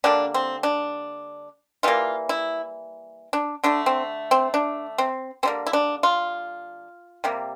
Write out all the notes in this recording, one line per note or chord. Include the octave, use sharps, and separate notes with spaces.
D3 G3 A#3 D4
C4
D4
E3 G3 A#3 F4
E4
D4
D3 A3 D4
C4
C4
D4
C4
D3 G3 A#3 C4
E4
D4
F4
C3 G3 A#3